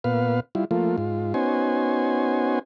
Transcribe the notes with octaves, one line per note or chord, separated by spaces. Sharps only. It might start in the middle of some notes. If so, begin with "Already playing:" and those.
A#2 B3 B4 F5
G3 E4 F4
F3 A3 A#3 F4
G#2 F4
B3 C#4 D#4 F#4 C5 G#5